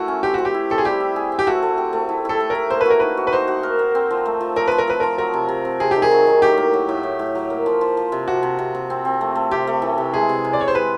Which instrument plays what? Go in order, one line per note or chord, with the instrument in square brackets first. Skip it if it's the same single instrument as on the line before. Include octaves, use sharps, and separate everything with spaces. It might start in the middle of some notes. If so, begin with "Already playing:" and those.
Already playing: [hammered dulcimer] A3 E4 [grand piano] F#4
[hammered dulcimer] C#4
[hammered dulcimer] C4 [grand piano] G4
[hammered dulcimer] C4 [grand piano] F#4
[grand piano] G4
[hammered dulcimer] E4
[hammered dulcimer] C4 [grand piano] A4
[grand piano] G#4
[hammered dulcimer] G3 [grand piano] G4
[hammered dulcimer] E4
G#4
C4
[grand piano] G4
[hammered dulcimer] A3 [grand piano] F#4
[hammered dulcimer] A3
G4
A3
E4
[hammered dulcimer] E4 [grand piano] A4
[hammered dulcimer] A3
[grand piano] A#4
[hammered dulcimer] A3
[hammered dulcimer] A#3 [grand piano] C5
[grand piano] B4
[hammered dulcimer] F#4 [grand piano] A#4
[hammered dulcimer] D#4 [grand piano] B4
[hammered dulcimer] F#4
[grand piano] B4
[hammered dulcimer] D#4 [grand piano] C5
[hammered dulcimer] F#4
A#4
A#3
C4
F3
A3
F3
[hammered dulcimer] F3 [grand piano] A#4
[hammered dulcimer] F3 [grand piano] B4
[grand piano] A#4
[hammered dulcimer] F3 [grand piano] B4
[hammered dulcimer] F3 [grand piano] A#4
[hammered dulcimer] F#3 [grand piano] A#4
[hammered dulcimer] C3
C3
C3
[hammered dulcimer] C3 [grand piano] G#4
[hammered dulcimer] D#3 [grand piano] G4
[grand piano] G#4
[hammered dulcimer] F#3
D#3
[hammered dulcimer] A2 [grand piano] G4
[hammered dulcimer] A#3
F#3
A2
A2
A2
F#3
A#3
F3
F3
F3
C3
[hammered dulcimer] C3 [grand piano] F#4
[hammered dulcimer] C3
C3
C3
C4
C4
A3
A3
[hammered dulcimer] C3 [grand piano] G4
[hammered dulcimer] A3
E3
C3
[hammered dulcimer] G#3 [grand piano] G#4
[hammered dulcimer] C3
C3
[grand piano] D5
[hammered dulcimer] C3 [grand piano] C#5
[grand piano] C5
[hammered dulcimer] G#3 [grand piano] B4